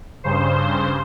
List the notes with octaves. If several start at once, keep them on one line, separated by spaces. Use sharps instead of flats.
G2 C#3 C5